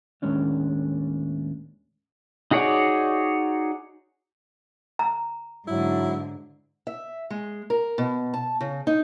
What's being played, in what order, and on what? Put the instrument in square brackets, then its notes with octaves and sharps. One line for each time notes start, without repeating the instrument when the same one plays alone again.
[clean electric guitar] D#2 A2 G#3 C#4 D4
[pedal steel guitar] D#4 F#4 G#4 C#5 D5
[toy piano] A#5
[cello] G#2 D3 [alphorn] F#3 [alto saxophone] E4
[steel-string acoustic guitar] E5
G#3
A#4
B2
A5
C#3
D#4